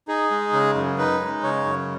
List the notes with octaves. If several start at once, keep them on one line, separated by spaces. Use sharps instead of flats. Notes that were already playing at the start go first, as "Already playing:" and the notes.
D#4 G#4
G#3
C#3
F#2
D#4 B4
G#3
C#3 C#5
F#2